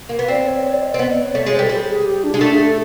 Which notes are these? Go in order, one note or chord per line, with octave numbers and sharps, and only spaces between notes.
A#3
B3
C4 D5
C#5
C#5
D5
D#5
C4 D5
B3 D#5
D5
C#5
A3 C#5
G#3
C5
G3
A4
G3 G#4
G#4
G4
D4
G#3
A3 D4
G#4
A4